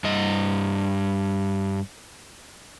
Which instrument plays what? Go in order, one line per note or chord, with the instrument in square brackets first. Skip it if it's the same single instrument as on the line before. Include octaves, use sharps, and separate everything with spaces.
[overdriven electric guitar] G2 D#5